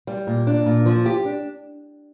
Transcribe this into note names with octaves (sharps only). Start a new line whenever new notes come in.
G3
A#2
D4
A#2
F3
G4
D4